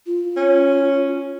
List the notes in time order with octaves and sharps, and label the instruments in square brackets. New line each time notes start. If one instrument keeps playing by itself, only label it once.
[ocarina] F4
[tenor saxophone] C#4